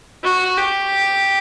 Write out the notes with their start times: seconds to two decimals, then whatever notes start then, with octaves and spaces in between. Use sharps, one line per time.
0.23 F#4
0.57 G4